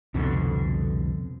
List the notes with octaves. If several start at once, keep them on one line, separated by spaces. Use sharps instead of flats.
C2 F2 B2 D3